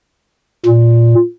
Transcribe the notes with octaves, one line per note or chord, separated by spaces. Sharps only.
A#2